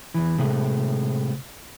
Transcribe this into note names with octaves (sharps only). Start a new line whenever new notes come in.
E2 E3
A2 C3 G#3 A3